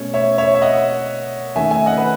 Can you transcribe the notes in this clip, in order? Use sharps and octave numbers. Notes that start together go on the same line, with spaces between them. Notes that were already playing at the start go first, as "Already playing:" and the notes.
Already playing: B2 A3 C#4 C#5
C#5 E5
C#5 E5
E5
D#5 F#5
D#3 A3 C#4 E5 G#5
E5 G#5
D#5 F#5
B4